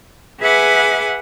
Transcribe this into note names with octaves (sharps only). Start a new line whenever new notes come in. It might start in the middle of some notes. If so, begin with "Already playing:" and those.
G#4 B4 E5 F#5 G#5 D6